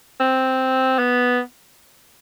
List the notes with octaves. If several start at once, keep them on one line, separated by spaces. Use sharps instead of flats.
C4
B3